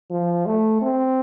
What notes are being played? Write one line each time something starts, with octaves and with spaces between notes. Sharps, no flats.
F3
A3
C4